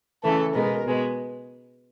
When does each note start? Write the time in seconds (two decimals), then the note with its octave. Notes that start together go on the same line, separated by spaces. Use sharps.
0.24 C#3 E3 A3 A4
0.54 B2 G#3 B3 A#4
0.86 B2 G#3 B3